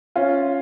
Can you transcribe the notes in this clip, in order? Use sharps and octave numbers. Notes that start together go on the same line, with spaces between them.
C#4 F4